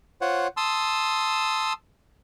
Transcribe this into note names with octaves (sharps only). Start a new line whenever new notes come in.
F4 C5 C#5 F#5
A5 C6 D#6 E6